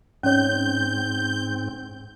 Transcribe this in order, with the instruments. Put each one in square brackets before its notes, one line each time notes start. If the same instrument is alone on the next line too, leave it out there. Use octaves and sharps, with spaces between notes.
[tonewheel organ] G#2 C4 [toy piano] C#4 C#5 [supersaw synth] G6